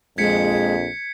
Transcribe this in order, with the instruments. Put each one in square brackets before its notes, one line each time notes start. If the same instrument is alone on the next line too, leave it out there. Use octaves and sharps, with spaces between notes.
[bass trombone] A#1 [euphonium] F2 [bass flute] G#3 [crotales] G#6 B6 C#7